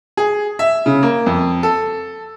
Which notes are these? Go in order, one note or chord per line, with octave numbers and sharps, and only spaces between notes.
G#4
E5
C#3
A#3
F2
A4